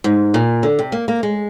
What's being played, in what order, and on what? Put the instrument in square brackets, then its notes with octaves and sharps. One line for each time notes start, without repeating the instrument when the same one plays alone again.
[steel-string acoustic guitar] G#2
A#2
D3
C3
A#3
A#3
G#3